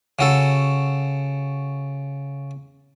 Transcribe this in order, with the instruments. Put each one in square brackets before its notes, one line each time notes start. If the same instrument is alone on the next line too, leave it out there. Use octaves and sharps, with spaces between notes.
[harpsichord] C#3 F#4 A4